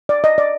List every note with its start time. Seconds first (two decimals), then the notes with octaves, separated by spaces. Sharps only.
0.09 D5
0.24 D#5
0.38 D5